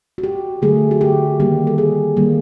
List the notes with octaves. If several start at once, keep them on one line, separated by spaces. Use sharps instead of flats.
F#4
G4
D3 F#3 A3 G#4
F#4
G4
D#3 G3 A#3 G4
A4
G#4
D#3 G3 A#3